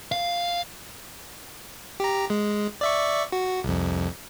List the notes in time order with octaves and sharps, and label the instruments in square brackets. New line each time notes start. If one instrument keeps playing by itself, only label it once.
[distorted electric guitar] F5
[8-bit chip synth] G4 A#5
G#3
D5 E5 C#6
F#4
C2 F2